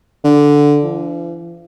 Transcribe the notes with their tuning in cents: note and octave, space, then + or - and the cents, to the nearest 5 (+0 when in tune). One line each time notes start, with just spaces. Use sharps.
D3 -5
F3 -45